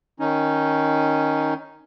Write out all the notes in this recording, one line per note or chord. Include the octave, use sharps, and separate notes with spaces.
D#3 C#4 D#4